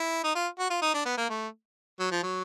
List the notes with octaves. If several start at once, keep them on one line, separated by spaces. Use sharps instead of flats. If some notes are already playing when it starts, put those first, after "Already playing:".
Already playing: E4
D#4
F4
F#4
F4
D#4
D4
B3
A#3
A3
F#3
F3
F#3